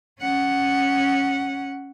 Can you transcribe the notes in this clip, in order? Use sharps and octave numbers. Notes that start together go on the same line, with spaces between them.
C#4 F#5